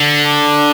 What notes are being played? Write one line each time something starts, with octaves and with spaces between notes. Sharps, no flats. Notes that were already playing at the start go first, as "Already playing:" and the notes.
Already playing: D3
D4